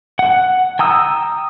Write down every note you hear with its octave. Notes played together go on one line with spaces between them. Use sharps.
F#5
G5 A#5 D#6 E6